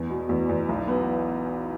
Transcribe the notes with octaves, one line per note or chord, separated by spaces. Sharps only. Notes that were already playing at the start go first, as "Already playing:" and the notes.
Already playing: E2
B2
E2
E2
B1
B3